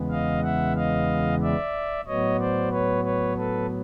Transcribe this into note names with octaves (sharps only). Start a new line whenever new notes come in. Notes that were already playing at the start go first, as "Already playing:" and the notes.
Already playing: E2 C#3 E3 G#3 B3
D#5 F5
E5 F#5
D#5 F5
D5 E5
A2 F#3 B3 C#5 D#5
C5 D5
B4 C#5
B4 C#5
A4 B4